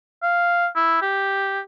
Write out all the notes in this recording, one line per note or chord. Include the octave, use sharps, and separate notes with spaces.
F5
E4
G4